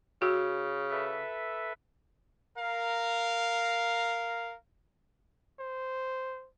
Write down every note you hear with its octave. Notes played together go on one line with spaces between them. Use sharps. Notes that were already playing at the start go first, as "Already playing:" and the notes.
C#3 F#4
A4 B4 E5
A#4 F5
C5